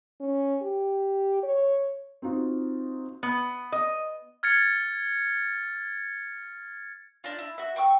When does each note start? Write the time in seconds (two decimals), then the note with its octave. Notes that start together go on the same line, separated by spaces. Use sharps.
0.21 C#4
0.62 G4
1.43 C#5
2.22 C4 D#4 F4 F#4
3.23 B3
3.72 D#5
4.43 F6 G#6 A6 C#7
7.24 D4 D#4 F4
7.38 E4
7.58 F#4 E5
7.76 G5 C#6 D6 E6